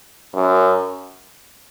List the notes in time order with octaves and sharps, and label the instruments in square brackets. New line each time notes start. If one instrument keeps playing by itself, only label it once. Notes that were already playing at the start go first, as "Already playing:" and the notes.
[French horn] F#2